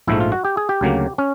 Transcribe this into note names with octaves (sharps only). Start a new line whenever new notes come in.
A#1 G#2 F3 A3 E4
F4
F#4
G4
G#4
G4
D2 C#3 F#3 A#3
C#4